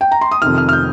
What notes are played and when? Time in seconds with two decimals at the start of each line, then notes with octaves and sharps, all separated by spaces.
0.01 G5
0.12 A#5
0.21 C6
0.31 D#6
0.42 F2 C3 D#3 F6
0.58 F6
0.69 F6
0.73 G6